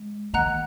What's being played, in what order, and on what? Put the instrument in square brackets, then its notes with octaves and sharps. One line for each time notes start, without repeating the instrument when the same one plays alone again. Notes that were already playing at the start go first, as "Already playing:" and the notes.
Already playing: [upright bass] G#3
[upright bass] D#3 [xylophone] D#5 F#5 A#5 F#6